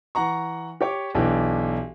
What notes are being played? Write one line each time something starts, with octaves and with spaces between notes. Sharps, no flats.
E3 F#5 A#5 C#6
G4 C#5 D6
B1 E3 D4 G4